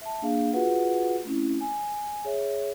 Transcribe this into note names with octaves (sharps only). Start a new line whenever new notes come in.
E5 A5
A#3 D4 G#4 F5
F4 F#4 G#4 B4 F#5
A3 C4 C#4 E4
G#5
G#4 C#5 E5